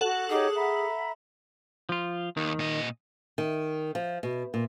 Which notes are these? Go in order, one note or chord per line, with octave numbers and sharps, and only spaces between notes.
F#4 A4 F#5 F#7
D#4 G4 G#4 C#5
E5 A#5 B5
F3 F4
D#2 D#3
A#2 D#5
D#3
F3
B2
A#2